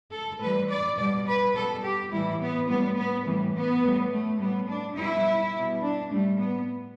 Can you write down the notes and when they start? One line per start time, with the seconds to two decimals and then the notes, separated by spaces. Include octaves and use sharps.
0.12 A4
0.40 A2 E3 G3 B4
0.69 D5
0.97 B2 G3 D5
1.25 B4
1.54 B2 G3 A4
1.83 G4
2.11 A2 E3 G3 E4
2.40 B3
2.68 A2 G3 B3
2.96 B3
3.25 A2 E3 G3
3.54 B3
3.83 A2 G3
4.11 A3
4.39 A2 G3 B3
4.68 D4
4.96 B2 G3 E4
5.53 B2 G3
5.82 D4
6.10 A2 G3 A3
6.39 B3